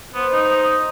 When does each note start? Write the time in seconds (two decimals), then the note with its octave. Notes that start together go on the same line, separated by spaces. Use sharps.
0.15 B3 C5
0.32 D#4